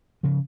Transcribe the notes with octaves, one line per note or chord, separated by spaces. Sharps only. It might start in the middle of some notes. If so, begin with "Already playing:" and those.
C#3 F3